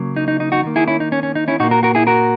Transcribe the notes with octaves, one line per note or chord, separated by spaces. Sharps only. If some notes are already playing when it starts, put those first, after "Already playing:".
Already playing: C#3 F#3 A#3
D#4
D#4
D#4
D#4 F#4
D#3 A#3
E4 G#4
C#4 E4
D#4
C#4
C#4
D#4
C#4 E4
A#2 A#3 D#4 F#4
F#4 A#4
F#4 A#4
E4 G#4
F#4 A#4